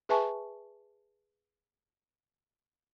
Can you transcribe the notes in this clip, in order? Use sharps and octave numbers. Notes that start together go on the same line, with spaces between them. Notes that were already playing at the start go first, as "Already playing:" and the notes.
G#4 B4 E5 G#5 A5 C#6